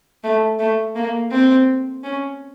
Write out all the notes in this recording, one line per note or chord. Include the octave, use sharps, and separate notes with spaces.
A3
A3
A#3
C4
C#4